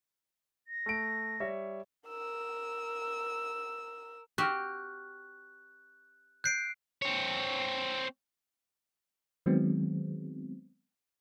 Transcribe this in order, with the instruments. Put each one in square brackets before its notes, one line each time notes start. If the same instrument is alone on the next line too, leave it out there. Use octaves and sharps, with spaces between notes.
[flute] A#6
[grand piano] A3 D7
G3 C#5 E5
[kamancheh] A#4 E6
[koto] C4 F#4 G4 [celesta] C#6 F6 [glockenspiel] F#6
[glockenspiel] F#6 C7 D7 [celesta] G6
[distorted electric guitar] C4 C#5
[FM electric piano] D#3 F#3 G#3 B3 C4